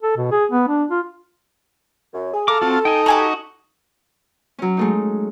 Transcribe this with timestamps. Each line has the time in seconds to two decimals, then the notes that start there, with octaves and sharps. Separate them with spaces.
0.03 A4
0.17 B2
0.31 G#4
0.52 B3
0.68 D4
0.90 F4
2.13 F#2
2.34 G#4
2.48 A4 F5 A#5 D6
2.62 C4 F4 F#4 A5
2.85 D#4 G5 G#5
3.06 F#4 G4 G#5 A#5
4.59 F#3 C#4
4.77 G#3 A3 D#4